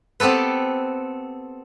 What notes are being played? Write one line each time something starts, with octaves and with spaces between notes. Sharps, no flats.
B3 C4 G4 A4 B4